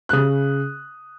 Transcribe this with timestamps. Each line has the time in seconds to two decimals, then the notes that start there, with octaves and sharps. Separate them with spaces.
0.09 F#6
0.13 C#3 D#6